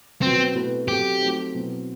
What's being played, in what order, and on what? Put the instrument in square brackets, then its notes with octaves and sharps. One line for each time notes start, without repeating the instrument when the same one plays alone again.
[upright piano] B2 F#3 B3 [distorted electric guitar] C4
[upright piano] B2 A3 C4 E4 B4
[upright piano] F#3 C4 F#4 A4 [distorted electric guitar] G4
[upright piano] F#3 A3 C4 D#4
B2 F#3 C4 E4